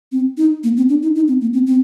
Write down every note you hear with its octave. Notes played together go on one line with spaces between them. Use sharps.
C4
D#4
A#3
C4
D4
D#4
D#4
C4
A#3
C4
C4